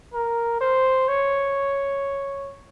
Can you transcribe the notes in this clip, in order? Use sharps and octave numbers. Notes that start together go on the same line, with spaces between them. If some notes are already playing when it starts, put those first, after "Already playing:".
A#4
C5
C#5